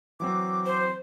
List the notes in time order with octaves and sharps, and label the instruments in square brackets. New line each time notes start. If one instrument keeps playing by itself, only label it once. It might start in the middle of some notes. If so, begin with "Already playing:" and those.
[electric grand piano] E3 F#3 C4 [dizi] D6
[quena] C5